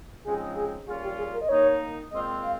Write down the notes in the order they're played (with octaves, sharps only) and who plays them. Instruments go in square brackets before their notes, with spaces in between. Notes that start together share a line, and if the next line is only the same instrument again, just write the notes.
[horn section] C#3 F3 G#3 C4 D#4 [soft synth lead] G#4
[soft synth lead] G#4
[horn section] A#2 G3 C#4 F4 [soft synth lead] G#4
[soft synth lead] G4
G#4
A#4
D#5
[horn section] D#3 A#3 D#4 [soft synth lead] C#5
[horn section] A#2 G#3 C4 F4 [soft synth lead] D#5
[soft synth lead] F5